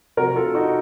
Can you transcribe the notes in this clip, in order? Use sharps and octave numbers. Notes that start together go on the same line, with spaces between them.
C3 F3 F#4 A#4
F4 A4
D#4 F#4